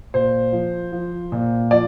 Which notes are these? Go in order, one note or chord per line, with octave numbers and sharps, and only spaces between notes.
A#2 C5
F3
F3
A#2
F3 D5